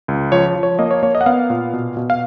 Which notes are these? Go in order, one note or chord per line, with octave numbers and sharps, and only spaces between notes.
C#2
F3 C#5
F3
C#5
A#3 D#5
C#5
A#3 C#5
D#5
F#5
B3 F5
A#2
B2
B2
F5